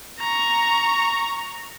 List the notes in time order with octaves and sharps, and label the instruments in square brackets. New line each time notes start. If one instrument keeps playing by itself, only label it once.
[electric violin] A#5 C#6